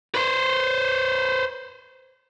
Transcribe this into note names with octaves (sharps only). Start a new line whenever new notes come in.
B4 C5